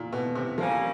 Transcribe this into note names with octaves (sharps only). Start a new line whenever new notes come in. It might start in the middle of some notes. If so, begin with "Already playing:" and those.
Already playing: A#2
B2
C3
D3 F3 G3 A#3 C#4